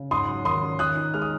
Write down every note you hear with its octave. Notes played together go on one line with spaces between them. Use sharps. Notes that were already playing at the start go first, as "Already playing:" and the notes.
Already playing: C#3
G#2 C6 D#6
F#3
D#3 C6 D#6
C#4
D#3 D#6 F#6
D#4
G#3 F6
D#6